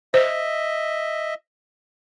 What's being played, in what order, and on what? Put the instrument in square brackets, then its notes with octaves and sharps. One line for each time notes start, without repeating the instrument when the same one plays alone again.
[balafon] C5 [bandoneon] D#5 E5